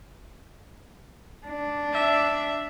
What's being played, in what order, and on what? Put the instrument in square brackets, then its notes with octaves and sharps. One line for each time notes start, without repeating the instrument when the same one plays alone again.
[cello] D4
[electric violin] E5